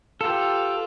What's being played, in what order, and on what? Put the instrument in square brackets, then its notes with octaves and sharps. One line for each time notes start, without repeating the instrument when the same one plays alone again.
[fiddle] F4 B4 [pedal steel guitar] G4 A4